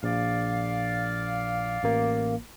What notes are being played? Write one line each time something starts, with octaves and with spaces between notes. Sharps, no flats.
A#1 D5 F5
A1 A#3